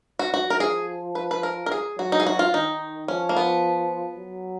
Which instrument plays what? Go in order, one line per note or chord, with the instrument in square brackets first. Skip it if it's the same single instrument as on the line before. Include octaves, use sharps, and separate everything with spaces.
[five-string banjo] F#4
[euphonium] F3 [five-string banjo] F#4
[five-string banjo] A#4
G#4
B4
B4
A#4
A#4
G#4
[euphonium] F#3 [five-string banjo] F#4
[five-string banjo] D#4
G#4
F#4
F4
[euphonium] D#3 [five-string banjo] D#4
[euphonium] F3 [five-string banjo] C#4
[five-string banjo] A#3
B3
[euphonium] F#3